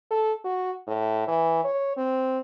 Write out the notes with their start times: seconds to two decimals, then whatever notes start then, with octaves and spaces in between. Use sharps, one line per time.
0.11 A4
0.44 F#4
0.87 A2
1.27 E3
1.64 C#5
1.97 C4